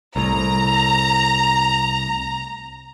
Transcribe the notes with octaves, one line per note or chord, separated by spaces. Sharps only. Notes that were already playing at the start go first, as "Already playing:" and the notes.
C2 A2 A#5